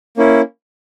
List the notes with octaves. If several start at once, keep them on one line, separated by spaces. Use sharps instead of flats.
A#3 C#4 E4